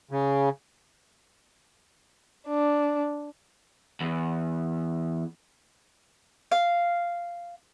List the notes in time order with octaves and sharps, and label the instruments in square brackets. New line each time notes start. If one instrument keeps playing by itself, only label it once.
[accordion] C#3
[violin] D4
[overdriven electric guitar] E2
[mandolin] F5